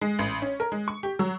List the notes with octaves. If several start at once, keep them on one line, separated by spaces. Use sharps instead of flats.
G#3
A1
C#4
A#4
G#3
C#6
G4
F#3